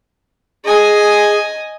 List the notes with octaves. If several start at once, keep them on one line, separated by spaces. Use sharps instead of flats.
G#4 D#5 G#5